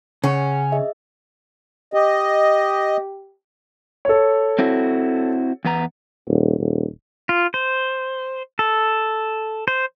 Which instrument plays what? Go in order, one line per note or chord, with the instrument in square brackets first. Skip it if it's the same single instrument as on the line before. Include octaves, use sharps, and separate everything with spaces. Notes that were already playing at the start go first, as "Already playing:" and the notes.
[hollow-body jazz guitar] C#3 [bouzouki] C#4 [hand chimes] G#4 F#5
[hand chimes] G#4 D#5 E5
[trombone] G4 [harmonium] D#5
[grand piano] A4 C#5
[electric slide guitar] C4 E4 F#4
E2 B3 A#5
[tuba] D#1
D#1
[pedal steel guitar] F4
C5
A4
C5